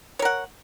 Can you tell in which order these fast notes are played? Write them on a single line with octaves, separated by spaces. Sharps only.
C#5 A#4 F#5